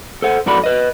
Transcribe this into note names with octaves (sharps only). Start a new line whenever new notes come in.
A4 C5 F#5
G#2 E3 F#4 A4 D5 B5
B4 D#5